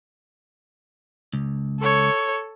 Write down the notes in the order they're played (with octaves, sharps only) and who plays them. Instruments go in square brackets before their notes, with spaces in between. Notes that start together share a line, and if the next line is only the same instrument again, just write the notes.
[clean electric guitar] C#2
[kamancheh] A4 C#5